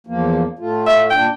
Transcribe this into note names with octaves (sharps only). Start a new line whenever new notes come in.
E2 F3 A#3
A2 A3 F4
E5
A#2 D4 G5